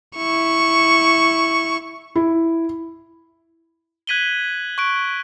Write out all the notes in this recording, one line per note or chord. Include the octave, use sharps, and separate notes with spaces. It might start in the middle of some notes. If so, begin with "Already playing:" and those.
E4 C#6
E4
F#6 G#6 B6 D#7 F#7 G7
C#6 F#6 D7